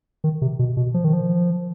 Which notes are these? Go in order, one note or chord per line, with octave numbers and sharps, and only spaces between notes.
D#3
C3
B2
B2
F3
D#3
F3